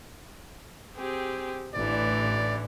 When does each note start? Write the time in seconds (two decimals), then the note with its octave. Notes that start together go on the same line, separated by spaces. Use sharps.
0.97 C4 G4 G#4
1.74 A1 A2 D3 E3 D5